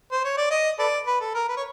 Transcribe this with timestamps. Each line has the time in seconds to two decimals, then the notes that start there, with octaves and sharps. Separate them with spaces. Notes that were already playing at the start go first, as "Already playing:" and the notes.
0.11 C5
0.24 C#5
0.37 D5
0.50 D#5
0.79 A4 B4 D5
1.07 B4
1.21 A4
1.35 A#4
1.49 B4
1.57 C#5